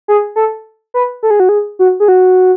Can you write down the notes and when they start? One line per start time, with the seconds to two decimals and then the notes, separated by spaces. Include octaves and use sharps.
0.08 G#4
0.36 A4
0.94 B4
1.23 A4
1.31 G#4
1.40 F#4
1.49 G#4
1.79 F#4
2.00 G#4
2.08 F#4